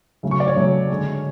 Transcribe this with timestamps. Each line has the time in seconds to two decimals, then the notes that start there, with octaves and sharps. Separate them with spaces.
0.23 C#3 F#3 A3
0.31 C#6
0.40 D5
0.48 C#5
0.56 C#3 F#3 A3
0.89 D3 G#3